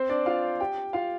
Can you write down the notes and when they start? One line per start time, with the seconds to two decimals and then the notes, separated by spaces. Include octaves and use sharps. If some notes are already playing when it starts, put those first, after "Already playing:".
Already playing: C4 C5
0.09 D4 D5
0.26 F4 F5
0.60 G4 G5
0.93 F4 F5